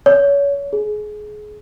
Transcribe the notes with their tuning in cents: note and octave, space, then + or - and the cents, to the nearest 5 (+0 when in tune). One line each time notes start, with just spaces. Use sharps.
C#5 +30
G#4 +25